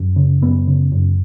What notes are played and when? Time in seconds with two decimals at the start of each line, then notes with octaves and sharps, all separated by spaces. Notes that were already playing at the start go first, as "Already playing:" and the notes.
Already playing: F#2
0.16 C#3
0.42 F#2 B3
0.67 C#3
0.92 F#2